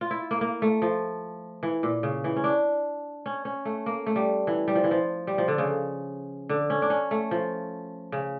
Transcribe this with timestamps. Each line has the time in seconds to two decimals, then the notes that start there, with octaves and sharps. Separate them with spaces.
0.01 F4
0.11 E4
0.31 A#3
0.41 A#3
0.62 A3
0.82 F3
1.63 E3
1.83 A#2
2.03 C#3
2.24 E3
2.36 C#4
2.44 D4
3.26 C#4
3.45 C#4
3.65 A3
3.86 A#3
4.06 A3
4.16 G3
4.47 E3
4.68 G3
4.75 F3
4.84 E3
4.91 F3
5.27 G3
5.38 F3
5.48 D3
5.58 C#3
6.49 D3
6.70 C#4
6.82 D4
6.90 C#4
7.11 A3
7.31 F3
8.12 C#3